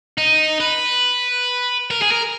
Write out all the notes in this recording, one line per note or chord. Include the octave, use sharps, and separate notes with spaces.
D#4
B4
A#4
G#4
A#4